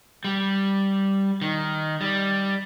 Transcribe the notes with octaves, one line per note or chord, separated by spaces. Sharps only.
G3
D#3
G3